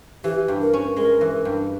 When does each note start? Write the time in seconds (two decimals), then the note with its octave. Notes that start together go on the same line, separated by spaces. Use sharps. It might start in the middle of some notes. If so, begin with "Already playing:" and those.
0.24 E3 G4
0.48 G2
0.61 A#4
0.73 C#4
0.97 G#3 A#4
1.21 E3
1.45 G2